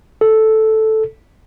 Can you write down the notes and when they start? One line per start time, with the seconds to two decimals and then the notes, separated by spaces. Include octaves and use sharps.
0.21 A4